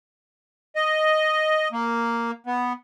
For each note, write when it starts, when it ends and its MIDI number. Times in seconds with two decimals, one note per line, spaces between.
0.76 1.68 75
1.72 2.31 58
2.47 2.73 59